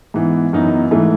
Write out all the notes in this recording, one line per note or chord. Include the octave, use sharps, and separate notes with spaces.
G#2 E3 B3
F#2 E3 B3 D#4
G#2 E3 A3